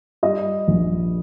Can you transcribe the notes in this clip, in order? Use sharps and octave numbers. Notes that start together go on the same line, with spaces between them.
G3 D#5
A#1